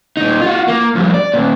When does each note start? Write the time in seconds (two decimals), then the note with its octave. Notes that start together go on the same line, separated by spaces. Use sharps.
0.17 A#2 D#4
0.41 F4 F#4
0.68 A#3
0.95 F2 G3
1.14 D5
1.34 D#2 A#2